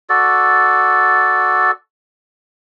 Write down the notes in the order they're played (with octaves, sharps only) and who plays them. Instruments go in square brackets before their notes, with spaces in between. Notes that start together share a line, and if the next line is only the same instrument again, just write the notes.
[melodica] F#4 A4 D5